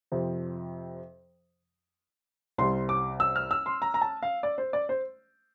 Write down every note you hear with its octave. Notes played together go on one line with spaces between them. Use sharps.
F2 C3 F3
C2 C3 G3 C6
D6
E6
F6
E6
C6
A#5
A#5
A5
F5
D5
C5
D5
C5